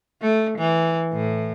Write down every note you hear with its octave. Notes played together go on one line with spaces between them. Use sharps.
A3
E3
A2